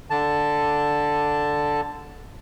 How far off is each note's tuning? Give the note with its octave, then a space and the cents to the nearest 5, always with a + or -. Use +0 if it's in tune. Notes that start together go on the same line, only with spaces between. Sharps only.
D3 +0 A5 +5